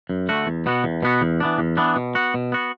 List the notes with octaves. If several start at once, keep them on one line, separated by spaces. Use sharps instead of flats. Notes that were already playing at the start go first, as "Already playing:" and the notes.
F#2
D3 A3 F#4
E2
B2 B3 F#4
E2
B2 B3 F#4
E2
E3 B3 D4
E2
E3 B3 D4
B2
B3 F#4
B2
B3 F#4